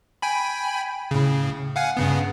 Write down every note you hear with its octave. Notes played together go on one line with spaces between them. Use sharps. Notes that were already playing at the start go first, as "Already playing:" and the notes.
G5 G#5 B5
A2 C#3
F5 F#5 G#5
G2 C#3 B3